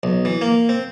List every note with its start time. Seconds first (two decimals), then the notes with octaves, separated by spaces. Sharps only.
0.03 B1
0.25 E3
0.42 A#3
0.69 C4